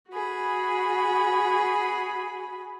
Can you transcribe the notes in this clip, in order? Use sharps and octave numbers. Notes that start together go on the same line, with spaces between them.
F#4 G#4 B5